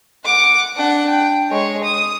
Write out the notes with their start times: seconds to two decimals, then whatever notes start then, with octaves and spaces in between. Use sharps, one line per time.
0.25 F#5 D6
0.76 D4 F#5
1.09 G5
1.50 G#3 C#5
1.84 D#6